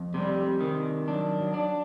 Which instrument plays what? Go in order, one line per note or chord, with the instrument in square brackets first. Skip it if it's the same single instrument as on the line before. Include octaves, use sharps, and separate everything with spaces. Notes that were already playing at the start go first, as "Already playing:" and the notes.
Already playing: [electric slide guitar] F2
[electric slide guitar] C3 [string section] G3
[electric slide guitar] D#3
[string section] F#3 [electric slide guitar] D4
[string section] F#3
[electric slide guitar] D4